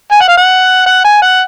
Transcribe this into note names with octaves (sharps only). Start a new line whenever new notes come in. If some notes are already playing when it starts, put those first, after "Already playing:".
G#5
F#5
F5
F#5
F#5
G#5
F#5